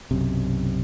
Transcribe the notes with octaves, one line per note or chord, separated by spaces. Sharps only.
B1 F#2 C3